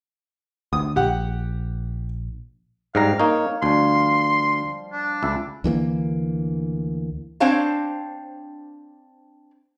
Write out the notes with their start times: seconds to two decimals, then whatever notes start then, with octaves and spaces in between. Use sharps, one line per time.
0.73 D2 D#6
0.96 A#1 G4 F#5
2.95 G#2 G3 F5 A#5
3.20 A#3 D#4 C#5 F5
3.63 D2 F3 G3 C6
4.93 D4
5.23 C#2 E5 B5 D6
5.64 D2 E3 A3 A#3
7.40 C4 D4 C5 C#5 F5 A5